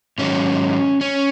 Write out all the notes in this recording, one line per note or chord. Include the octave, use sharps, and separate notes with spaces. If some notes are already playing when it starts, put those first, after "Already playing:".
G#2 D#3 F#3 C#4
C#4